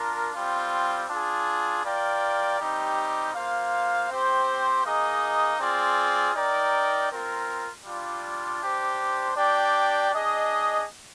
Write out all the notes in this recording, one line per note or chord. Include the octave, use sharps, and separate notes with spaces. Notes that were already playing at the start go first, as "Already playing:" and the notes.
Already playing: D4 F4 A#4
G3 C4 F4
D4 F4 G#4
F4 A#4 D5 G5
G3 C4 D#4 G4
A#3 F4 C5 F5
C4 G4 C5
A#3 D#4 G#4 D#5
C4 F4 G#4 D5
D#4 A#4 D5 G5
C4 F4 A#4
G3 D4 F4
D4 G4 C5
D4 G4 D5 G5
D4 G#4 D#5